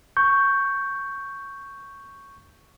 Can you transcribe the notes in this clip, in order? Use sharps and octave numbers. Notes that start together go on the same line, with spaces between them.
C#6 G6